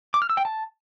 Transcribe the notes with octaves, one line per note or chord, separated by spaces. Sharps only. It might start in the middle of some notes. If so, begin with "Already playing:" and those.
D6
F6
E6
G5
A5